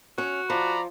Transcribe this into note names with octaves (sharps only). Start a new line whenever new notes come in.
C#4 F#4
F3 D5 A#5 B5